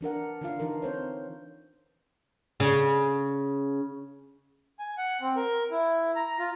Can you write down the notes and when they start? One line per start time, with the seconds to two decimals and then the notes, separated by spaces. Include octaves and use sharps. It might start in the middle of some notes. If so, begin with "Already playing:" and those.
0.01 E3 D4 A#4 F#5
0.41 D3 E3 D4 F4 F5
0.59 E3 D#4 A#4
0.82 C4 C5 C#5
2.60 C#3
4.79 G#5
4.98 F#5
5.21 C4
5.36 A#4
5.71 E4
6.16 A#5
6.39 F4